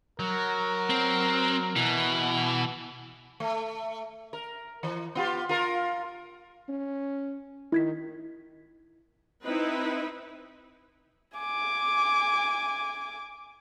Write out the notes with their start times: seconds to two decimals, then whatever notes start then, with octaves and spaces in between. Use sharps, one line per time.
0.19 F#3 A#4
0.90 C4
1.76 B2 E3
3.40 A3
4.33 A#4
4.83 E3
5.15 B3 F4 G4
5.49 F4 A#4
6.69 C#4
7.72 D#3 E4 G#6 B6
9.43 C4 D#4 E4 B4
11.38 G#5 D6